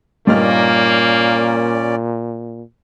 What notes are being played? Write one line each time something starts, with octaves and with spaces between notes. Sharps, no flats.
G2 A#2 A#3 C#4 D#4 D5 F6